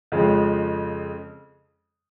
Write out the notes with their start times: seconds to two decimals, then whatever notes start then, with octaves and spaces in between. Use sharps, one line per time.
0.12 F2 C#3 F3 G#3